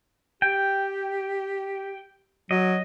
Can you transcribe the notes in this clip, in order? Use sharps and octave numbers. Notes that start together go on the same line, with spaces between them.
G4 G5
F#3 D#5